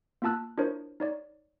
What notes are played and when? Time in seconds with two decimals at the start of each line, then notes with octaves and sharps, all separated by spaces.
0.22 A#3 B3 F4 A5 E6 F#6
0.58 D4 E4 F4 A#4 C5 C#5
1.00 D#4 C#5 D5